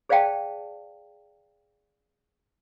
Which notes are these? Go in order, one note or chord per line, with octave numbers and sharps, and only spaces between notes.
G#4 C5 D5 F5 G5 A5